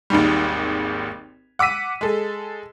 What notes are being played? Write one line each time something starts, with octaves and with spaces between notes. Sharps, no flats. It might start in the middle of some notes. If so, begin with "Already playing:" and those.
G#1 D#2 G#2 G3
F#5 D6 E6 B6 D#7
G#3 A4